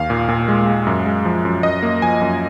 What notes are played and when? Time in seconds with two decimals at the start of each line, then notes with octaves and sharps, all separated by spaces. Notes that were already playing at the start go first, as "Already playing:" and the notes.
Already playing: D#2 F5
0.10 A#2
0.29 A#2
0.48 G#3
0.67 G#3
0.87 F#2
1.06 G#3
1.25 F3
1.45 F#2
1.63 F#2 D#5
1.83 A#3
2.02 F3 G#5
2.22 F#2